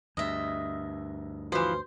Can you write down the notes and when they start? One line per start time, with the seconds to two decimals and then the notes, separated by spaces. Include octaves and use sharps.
0.17 D2 G2 D#5 E5
1.52 E3 F3 F#4 B4 C5